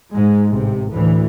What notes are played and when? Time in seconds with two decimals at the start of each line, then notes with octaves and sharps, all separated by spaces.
0.13 G#2 G#3
0.50 A1 C3
0.94 D2 A2 E3